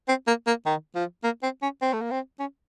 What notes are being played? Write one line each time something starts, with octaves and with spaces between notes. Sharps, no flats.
C4
A#3
A#3
D#3
F3
A#3
C4
C#4
C4
A3
A#3
C4
C#4